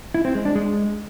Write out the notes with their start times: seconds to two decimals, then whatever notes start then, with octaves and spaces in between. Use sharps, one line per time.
0.15 E4
0.25 C4
0.35 G#3
0.45 D4
0.55 G#3